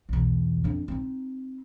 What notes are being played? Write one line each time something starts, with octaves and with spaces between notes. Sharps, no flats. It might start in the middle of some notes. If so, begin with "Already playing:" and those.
B1 E2
F2 D4
C4 D#4